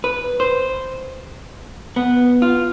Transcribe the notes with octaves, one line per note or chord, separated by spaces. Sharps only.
B4
C5
B3
F4